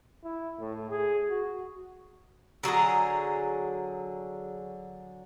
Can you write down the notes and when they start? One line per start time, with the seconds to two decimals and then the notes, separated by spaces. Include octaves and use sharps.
0.24 E4
0.60 A2
0.91 G#4
1.30 F#4
2.63 D3 F#3 G#4 A#5